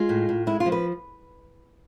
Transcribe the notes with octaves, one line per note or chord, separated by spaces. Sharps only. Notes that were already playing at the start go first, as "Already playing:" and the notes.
Already playing: G#3 F4
A2
A2
G#3 E4
F4
F3
B4